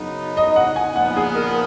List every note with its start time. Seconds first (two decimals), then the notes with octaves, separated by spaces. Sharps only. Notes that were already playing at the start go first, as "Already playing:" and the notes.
Already playing: F#2 C#3 F#3 B3 D#4
0.37 D#5
0.56 F#5
0.76 G#5
0.96 A#2 F3 B3 F#5
1.17 G#4
1.35 A#4